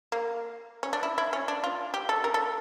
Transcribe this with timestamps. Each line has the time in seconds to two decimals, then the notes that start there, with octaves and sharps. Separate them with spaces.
0.12 A#3
0.83 C#4
0.93 D4
1.03 E4
1.18 E4
1.33 C#4
1.48 D4
1.64 F4
1.94 G4
2.09 A4
2.24 A#4
2.34 A4